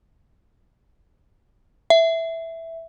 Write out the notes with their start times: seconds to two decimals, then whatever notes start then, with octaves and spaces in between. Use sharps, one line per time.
1.90 E5